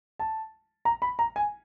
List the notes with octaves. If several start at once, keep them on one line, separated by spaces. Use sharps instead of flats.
A5
A#5
B5
A#5
G#5